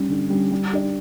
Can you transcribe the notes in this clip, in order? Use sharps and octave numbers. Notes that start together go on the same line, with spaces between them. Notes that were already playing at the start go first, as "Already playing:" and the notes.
Already playing: G3 C#4
D3
G3 C#4
G3
D4 G4 D5